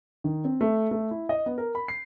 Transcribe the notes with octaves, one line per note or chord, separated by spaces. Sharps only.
D#3
C4
A3
A3
E4
D#5
B3
A#4
B5
C7